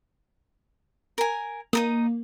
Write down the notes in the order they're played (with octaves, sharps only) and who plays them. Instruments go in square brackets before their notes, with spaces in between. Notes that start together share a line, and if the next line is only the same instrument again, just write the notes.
[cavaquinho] A#4 G#5
[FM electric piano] A#3 [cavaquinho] D#4 A#4 D#6